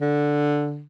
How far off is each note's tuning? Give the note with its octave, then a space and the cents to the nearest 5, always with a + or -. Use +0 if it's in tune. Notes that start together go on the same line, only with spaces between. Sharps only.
D3 +0